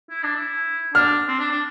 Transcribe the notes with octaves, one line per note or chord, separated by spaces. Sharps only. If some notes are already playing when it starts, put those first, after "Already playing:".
E4
D4
E4
D4 F6
C4
D4
D4